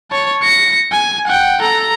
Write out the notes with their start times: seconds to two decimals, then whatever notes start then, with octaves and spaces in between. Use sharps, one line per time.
0.11 C#5 A5
0.43 A#6 C#7
0.92 G#5
1.27 F#5 G5
1.61 A4 A#5